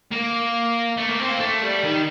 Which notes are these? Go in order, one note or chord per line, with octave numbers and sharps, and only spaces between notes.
A#3
A3
A#3
C4
A#3
A3
G3
D#3